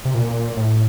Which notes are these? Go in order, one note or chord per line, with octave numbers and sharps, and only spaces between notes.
C3
A#2
A2